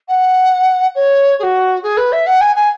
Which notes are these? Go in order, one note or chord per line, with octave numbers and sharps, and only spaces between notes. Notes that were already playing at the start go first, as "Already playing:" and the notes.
F#5
C#5
G#4
F#4
G#4
B4
E5
F#5
G#5
G#5